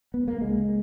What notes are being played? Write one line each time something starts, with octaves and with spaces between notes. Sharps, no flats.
B3
A#3
C#2 G#3